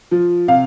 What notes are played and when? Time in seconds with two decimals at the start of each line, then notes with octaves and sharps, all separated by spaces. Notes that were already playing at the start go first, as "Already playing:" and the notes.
0.11 F3
0.48 C3 F5